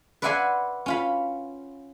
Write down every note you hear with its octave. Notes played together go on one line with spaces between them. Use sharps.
B4 D5 E5 F#5 G#5 C6
C#4 F4 B5